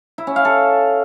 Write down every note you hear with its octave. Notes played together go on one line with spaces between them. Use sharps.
E4
C#4
F5
A4